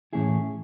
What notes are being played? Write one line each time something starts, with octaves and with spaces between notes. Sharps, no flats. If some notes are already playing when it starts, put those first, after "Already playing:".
A2 E3 A3 C#4 E4 G#4